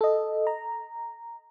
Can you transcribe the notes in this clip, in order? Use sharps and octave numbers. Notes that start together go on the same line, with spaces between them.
A4 D#5
A#5